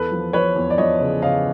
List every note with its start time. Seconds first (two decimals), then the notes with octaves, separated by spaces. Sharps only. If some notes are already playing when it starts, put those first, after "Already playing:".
Already playing: E2 A4 B4
0.12 F3
0.33 F3 B4 C#5
0.56 E2
0.70 D5
0.78 F3 C#5 D#5
1.01 C#3
1.22 C#3 D#5 F5